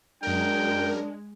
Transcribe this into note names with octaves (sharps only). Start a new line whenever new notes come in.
F#2 G#3 D4 A#4 G5